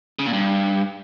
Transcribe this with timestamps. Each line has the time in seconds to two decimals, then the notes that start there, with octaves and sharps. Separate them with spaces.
0.19 C#3
0.26 A#2
0.33 G2